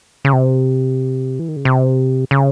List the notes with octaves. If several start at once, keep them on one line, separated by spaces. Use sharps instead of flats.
C#3
C3
E3
D#3
C#3
C3
C#3